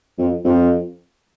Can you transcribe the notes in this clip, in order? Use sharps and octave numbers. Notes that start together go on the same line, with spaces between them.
F2
F2